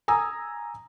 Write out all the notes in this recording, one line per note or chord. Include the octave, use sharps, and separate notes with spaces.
G#5 A#5 D#6 E6